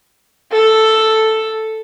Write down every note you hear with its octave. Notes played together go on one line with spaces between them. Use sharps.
A4